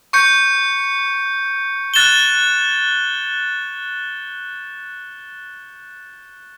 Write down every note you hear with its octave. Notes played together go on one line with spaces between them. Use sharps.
C#6 G6 C#7
F#6 A6 E7 G7